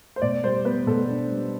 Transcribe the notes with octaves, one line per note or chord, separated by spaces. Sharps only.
C5
B2 D5
G3 C5
B3 B4
B2 A4
D4
G3